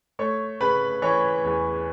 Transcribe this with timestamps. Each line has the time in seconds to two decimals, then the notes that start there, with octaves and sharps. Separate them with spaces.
0.19 A3 C#5 C#6
0.60 C#3 B4 B5
1.02 E3 C#5 C#6
1.44 E2